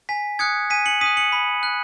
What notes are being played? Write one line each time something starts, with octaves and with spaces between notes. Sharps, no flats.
G#5 B6
D#6 F#6 G#6 C#7
G#5 B6 D#7
C#7 F#7
D#6 F#6 B6 D#7
C#7 F#7
B5
F#6